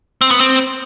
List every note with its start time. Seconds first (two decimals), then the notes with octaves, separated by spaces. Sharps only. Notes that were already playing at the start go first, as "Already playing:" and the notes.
0.21 C4
0.31 B3
0.40 C4